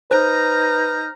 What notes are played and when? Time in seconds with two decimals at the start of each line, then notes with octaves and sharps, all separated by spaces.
0.11 D#4 B4 C5 A#5 F6 G6